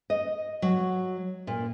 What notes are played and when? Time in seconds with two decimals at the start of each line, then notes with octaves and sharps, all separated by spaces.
0.10 D#5
0.62 F#3
1.47 A#2